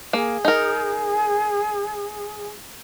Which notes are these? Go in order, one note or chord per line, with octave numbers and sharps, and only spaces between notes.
A#3 G#4
D#4 A#4